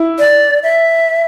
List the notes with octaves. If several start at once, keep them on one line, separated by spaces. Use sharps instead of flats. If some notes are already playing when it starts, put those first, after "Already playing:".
Already playing: E4
D5
E5